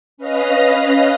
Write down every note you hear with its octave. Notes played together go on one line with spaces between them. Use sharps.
C#4 B4 D#5 F5 F6 A#6